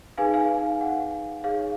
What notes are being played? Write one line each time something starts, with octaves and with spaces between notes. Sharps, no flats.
D#4 G#4 B4 F5 G#5
F5 G#5
F#5
D#4 G#4 C#5 F5